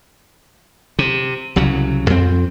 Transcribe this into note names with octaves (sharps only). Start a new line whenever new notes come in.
C3
C2 C#3 F#3
F2 C4